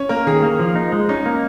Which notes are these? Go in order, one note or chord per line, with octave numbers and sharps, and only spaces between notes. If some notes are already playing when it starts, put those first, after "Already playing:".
Already playing: C#4 C#5
A#3 A#4
D#3 G#4
A#3
F3
D#4
G#3
C#4 D#4
A#3